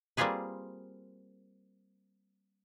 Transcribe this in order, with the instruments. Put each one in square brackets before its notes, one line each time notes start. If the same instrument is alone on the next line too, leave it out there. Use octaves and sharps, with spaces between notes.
[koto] G3 A#3 C4 F4 G#4 B4